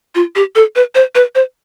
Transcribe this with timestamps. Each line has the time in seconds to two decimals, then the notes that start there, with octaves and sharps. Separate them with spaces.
0.15 F4
0.36 G4
0.55 A4
0.76 B4
0.95 C5
1.15 B4
1.35 C5